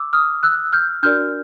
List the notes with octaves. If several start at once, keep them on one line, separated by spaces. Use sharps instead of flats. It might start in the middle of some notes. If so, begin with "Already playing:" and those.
Already playing: D6 E6
D#6 F6
E6 F#6
F6 G6
D4 F#4 A#4 D5 F6 G6